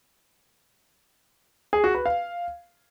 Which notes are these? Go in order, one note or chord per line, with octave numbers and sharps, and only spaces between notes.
G#4
F#4
B4
F5